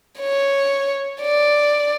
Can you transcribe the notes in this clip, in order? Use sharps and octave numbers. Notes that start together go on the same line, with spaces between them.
C#5
D5